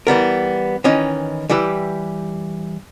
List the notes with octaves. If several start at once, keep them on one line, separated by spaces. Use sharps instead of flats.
E3 G3 B3 A#4
D#3 E3 C#4 D#4
E3 G3 E4 G4 B4